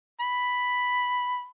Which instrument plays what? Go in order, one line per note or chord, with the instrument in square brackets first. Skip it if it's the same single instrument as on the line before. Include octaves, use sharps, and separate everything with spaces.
[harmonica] B5